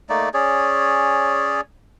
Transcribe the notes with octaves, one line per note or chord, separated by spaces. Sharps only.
A3 A#3 D#4 D5
C#4 G#4 C#5 D5